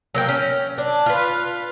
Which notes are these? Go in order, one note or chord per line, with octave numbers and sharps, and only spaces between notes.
F#3 A#3 G5
C#4
D4
F4 B4